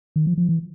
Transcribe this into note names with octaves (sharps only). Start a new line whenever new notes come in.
D#3
F3
F3
E3